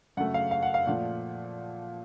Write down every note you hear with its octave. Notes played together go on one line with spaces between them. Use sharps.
F#2 C#3 A3 F#5
F5
F5
F#5
F5
A#2 F3 A3 F#5